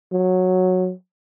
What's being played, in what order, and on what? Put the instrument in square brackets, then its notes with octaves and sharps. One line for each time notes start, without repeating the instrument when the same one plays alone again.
[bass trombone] F#3